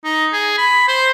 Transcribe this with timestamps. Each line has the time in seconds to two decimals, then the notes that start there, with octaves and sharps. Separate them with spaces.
0.04 D#4
0.32 G#4
0.58 B5
0.88 C5